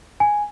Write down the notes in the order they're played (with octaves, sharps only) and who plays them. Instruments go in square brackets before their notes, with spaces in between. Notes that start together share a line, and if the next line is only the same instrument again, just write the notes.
[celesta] G#5